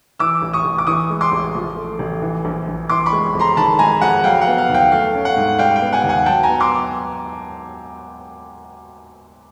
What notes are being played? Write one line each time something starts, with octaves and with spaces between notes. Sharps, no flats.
E3 D6 E6
A1
C#6 D#6
A1
D6
E3 C#6 D#6
G#3
C6 D6
A1
F3
A3
A1
E3
A#1
A#1
E3 C6 D6
B5 C#6
G#3
F2
A#5 C6
D#3 A5 B5
G#3 G#5 A#5
F2 F#5 G#5
F#3 F5 G5
F#5
B3
F5
D#2
F5 G5
A3 F5
C#4
F#5
G#2
G3 F5 G5
F5 G5
B3
F#5 G#5
D#2
F#5 G#5
F#3 G5 A5
G#5 A#5
B3
C6 D6